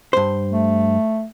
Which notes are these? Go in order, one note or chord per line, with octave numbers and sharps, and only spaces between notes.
G2 C5
A3